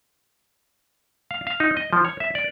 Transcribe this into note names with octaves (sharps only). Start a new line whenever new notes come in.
F5
F5
D#4
D#5
F3
C#5
E5
D5